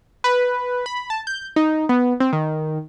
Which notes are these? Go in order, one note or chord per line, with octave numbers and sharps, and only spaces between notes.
B4
B5
A5
G6
D#4
B3
C4
D#3